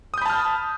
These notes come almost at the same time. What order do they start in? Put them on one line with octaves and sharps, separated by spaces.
D#6 G6 B5 A5 F6